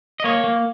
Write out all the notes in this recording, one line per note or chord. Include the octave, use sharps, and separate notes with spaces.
D#5
A#3 C#5
A#3